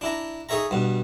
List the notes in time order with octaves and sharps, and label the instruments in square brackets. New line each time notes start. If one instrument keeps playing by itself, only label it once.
[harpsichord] D4 E4 A#5
D#4 G#4 C#5 E5 A#5
G2 B2